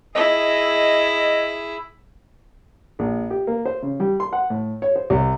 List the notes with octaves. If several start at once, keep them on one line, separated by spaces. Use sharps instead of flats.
E4 G#4 D#5
A#1
G4
A#3
C5
C#3
G3
C6
F#5
A2
C#5
C5
C2